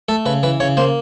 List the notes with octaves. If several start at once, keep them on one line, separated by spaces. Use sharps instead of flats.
A3 A4
C#3 B4
E3 B4
C#3 C#5
A#3 C5